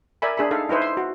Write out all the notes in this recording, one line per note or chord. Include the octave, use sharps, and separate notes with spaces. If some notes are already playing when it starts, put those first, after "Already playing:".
A#4 D5 E5 G#5 B5
D4 G#4 E5 B5
D#4 A4 F5
D#4 E4 B4 C5
C6
F#4